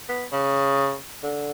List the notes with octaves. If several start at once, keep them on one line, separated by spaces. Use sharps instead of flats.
B3
C#3
D3